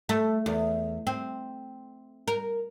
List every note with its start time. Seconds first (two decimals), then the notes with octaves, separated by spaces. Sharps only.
0.09 A3
0.46 E2
1.07 C4
2.28 A#4